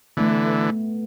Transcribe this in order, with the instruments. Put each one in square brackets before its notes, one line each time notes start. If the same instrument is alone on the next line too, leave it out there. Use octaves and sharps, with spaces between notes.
[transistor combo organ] D3 E3 [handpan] A3 B3